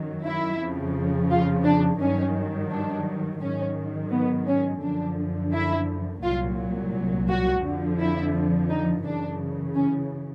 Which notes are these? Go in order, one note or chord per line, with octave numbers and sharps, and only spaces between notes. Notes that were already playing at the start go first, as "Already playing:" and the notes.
Already playing: F#2 D#3 F#3
E4
F2 C#3 F3
F4
D4
G2 D#3 F#3 C#4
D4
G#2 D#3 F#3 C#4
B3
C#4
F#2 D3 F3 D4
E4
C2 A#2 F#3 F4
F#4
F2 D3 F3
E4
D#4
F#2 C#3 E3 D4
C#4